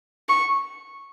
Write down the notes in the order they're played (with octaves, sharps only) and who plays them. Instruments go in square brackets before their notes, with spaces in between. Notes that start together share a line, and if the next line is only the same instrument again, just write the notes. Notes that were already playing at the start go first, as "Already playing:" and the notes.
[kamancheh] C#6